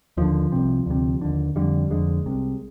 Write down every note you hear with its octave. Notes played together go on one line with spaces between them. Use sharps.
D#2 D3 F3
C2 C3
D2 C3
D#2 D3
F2 D3 G3
F2 D3 G#3
C2 C3